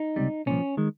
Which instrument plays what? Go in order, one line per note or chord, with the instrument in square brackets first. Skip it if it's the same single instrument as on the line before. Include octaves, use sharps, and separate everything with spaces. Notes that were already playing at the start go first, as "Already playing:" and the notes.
Already playing: [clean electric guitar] D#4
C#2 C3 G3
C2 A#2 F3 C#4
D#3 G#3